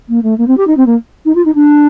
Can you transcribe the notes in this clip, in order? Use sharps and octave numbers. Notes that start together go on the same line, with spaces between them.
A#3
A3
A#3
C4
G4
D#4
C4
A#3
D#4
F4
D#4
D4